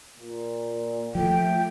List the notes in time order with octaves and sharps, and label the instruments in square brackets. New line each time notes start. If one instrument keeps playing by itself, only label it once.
[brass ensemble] A#2
[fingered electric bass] F3 [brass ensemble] A3 [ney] G5